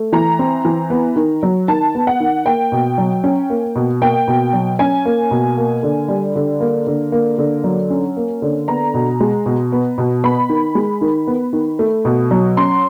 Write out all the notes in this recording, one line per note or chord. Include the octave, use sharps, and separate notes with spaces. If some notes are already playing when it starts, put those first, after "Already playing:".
Already playing: A3
E3 A#5
C4
E3
B3
D#3
F#3
D#3 A5
B3
F#5
D#3
A#3 G5
B2
F#3
C#4
A#3
B2
A#3 G5
B2
F#3
C#4 G#5
A#3
B2
A#3
D3
G3
D3
A#3
D3
A#3
D3
F#3
C#4
A#3
D3
B3 A#5
B2
G#3
B2
B3
B2
B3 B5
D#3
G#3
D#3
B3
D#3
A3
B2
F#3
C#4 C6